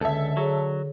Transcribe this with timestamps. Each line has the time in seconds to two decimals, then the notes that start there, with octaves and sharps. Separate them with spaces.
0.01 C#2 D3 A4 E5
0.37 F#3 G#4 C#5